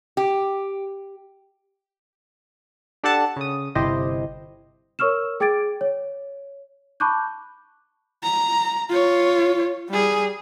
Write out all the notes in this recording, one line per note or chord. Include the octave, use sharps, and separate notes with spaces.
G4
D4 G4 A4 F#5 A5
C#3 D#6
G1 C3 E4 G4 C5 D#5
A#4 C#5 C#6 E6 F6 E7
G#4 G5 D6 G#6 A6 D7
C#5
A5 B5 C#6 D6 F#6 G6
A#5
F4 C#5
G3 G#4